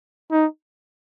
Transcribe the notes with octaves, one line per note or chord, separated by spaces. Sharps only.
D#4